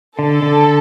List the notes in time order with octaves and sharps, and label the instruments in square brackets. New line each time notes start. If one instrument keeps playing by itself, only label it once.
[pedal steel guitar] D3 [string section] A4
[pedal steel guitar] D3